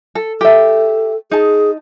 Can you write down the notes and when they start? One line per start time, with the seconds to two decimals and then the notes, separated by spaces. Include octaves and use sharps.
0.15 A4
0.41 G4 A4 E5
1.31 D#4 G#4 A5